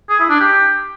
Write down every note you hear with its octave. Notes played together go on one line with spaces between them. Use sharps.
G#4
E4
D4
G4